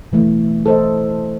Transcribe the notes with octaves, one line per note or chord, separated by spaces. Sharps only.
B2 E3 A3
A4 C5 D#5